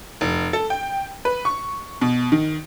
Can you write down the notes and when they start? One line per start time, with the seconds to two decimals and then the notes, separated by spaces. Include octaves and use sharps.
0.21 F1
0.53 A4
0.70 G5
1.25 B4
1.45 C#6
2.01 B2
2.32 D#3